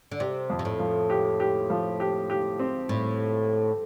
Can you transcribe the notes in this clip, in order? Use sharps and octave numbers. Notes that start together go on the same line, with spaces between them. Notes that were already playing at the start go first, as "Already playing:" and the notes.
D3
C3 G4
F2
C3
A2
F3
G4
G4
F3
G4
G4
C4
A2